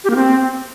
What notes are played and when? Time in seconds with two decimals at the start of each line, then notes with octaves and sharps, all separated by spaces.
0.04 G4
0.10 A#3
0.16 C4